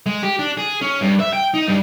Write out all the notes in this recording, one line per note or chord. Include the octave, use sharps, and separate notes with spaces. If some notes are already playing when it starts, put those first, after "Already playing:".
G#3
G4
D4
G#4
C#4
G2
E5
G5
D#4
G2